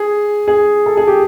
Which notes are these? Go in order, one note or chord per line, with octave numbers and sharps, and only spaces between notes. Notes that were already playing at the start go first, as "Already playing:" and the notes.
Already playing: G#4
G#4
A4
G#4
G4